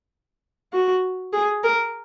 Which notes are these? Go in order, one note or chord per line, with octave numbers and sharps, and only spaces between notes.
F#4
G#4
A#4